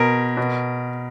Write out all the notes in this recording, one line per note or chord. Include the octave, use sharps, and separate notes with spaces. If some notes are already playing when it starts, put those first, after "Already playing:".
Already playing: B2 A#4
B2